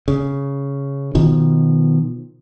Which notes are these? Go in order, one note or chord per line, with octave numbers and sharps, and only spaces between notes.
C#3
B2 D#3 F3